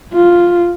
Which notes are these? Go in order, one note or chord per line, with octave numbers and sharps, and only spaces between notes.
F4